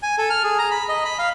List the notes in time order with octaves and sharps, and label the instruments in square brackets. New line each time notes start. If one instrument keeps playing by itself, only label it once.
[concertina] G#5
A4
F6
G#4
A#5
B5
D#5
B5
F5